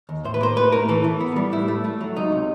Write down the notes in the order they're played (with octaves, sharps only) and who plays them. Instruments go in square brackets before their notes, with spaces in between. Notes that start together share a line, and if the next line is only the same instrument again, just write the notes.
[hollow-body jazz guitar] D#2
A2 C5
B4
A#3 C5
A2 B4
A2 A#4
E3 A4
E3
B3
G3
A2 E4
A3
A3
F#3
C#2 D#4
C3